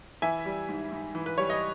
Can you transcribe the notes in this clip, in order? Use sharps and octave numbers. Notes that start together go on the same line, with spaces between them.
E3 E5 G#5
G3
G#2
G#2
E3
B4
G3 C#5
D#5